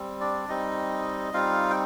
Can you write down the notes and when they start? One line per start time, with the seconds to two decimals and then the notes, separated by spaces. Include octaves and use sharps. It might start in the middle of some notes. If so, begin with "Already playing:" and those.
Already playing: G3 C4
0.21 D4 D5
0.49 G3 C4 D#4 D#5
1.33 G3 C4 D#4 F4 F5
1.70 G5